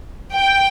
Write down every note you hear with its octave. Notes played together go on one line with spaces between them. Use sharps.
G5